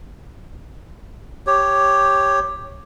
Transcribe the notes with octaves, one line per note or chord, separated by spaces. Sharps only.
G4 C#5